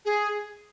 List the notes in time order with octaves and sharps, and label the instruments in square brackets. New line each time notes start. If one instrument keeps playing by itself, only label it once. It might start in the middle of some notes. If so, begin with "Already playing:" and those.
[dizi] G#4